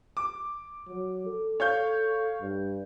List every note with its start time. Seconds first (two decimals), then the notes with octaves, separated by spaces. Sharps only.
0.17 D6
0.88 F#3
1.26 A4
1.60 C#5 F5 G6
2.42 G2